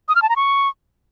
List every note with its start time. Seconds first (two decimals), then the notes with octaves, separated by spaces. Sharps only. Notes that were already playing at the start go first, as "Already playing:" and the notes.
0.09 D#6
0.15 F6
0.22 A5
0.29 A#5
0.36 C#6